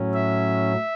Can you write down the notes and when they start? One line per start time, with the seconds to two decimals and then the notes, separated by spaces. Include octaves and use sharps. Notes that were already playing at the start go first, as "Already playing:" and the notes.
Already playing: A2 F#3 C#4
0.14 E5